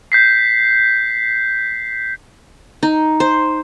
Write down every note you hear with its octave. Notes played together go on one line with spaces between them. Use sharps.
G6 B6 C7
D#4
C5